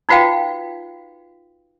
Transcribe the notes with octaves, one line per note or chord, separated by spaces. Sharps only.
D#4 F4 F#4 B4 F5 G5